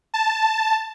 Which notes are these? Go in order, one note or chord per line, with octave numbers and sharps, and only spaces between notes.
A5